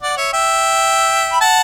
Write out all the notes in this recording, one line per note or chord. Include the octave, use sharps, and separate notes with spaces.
D5 F#5
C#5 E5
E5 G5
B5
F#5 A5